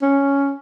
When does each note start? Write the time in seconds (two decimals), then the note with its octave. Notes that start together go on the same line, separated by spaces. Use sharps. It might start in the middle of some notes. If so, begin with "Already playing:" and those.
0.02 C#4